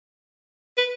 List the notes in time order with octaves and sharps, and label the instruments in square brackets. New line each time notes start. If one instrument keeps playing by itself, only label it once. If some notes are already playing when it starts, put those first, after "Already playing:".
[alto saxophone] B4